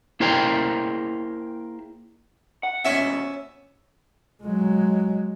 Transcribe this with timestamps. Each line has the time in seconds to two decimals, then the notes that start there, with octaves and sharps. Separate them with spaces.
0.20 A#3 E4 G#4 A#4 C5 G5
2.63 F#5
2.85 D#2 B2 C#4 E5
4.44 F#3 G#3